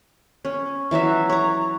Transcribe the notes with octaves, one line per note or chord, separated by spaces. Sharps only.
C#4
E3 F#3 F#4 E5
C#5 A#5